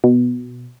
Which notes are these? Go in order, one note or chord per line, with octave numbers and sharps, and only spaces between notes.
B2